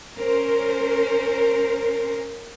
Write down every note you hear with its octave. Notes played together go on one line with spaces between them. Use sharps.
C#4 A#4 C5